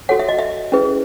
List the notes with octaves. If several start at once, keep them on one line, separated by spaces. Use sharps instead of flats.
F#4 A4 C#5 F#5
E5
D#5
E5
C#4 E4 G#4 B4